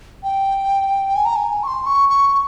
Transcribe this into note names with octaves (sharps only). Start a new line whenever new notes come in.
G5
G#5
A#5
G#5
C#6
C6
C#6
C#6
C#6